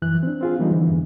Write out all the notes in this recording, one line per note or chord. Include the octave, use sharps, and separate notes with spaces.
F#2 E3 F#6
C4 D4
C4 F4 G#4
E3 G3 A#3 B3 D4 D#4
D3 E3
E2 G2